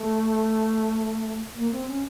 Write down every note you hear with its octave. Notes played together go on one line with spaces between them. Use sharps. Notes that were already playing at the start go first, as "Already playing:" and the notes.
Already playing: A3
A#3
C4
C#4